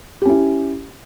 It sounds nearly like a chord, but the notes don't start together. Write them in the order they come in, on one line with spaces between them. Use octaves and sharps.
G4 C#4 E4